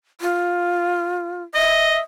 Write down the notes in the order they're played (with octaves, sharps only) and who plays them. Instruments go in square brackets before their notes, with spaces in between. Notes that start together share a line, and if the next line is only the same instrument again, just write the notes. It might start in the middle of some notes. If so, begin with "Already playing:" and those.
[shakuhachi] F4
[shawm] D#5 [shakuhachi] E5